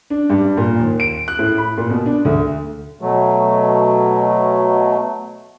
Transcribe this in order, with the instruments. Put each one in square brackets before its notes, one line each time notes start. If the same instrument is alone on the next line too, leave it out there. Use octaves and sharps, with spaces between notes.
[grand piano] D4
G2
A#2
D#2
D7
F#6
A2
B5
A#2
B2
D4
D2
[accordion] B2 F#3 A3